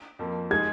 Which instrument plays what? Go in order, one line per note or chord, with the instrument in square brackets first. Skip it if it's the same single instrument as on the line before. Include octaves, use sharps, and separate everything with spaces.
[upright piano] F2 F3 A#3
[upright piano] G#3 D#4 G#4 [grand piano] G#6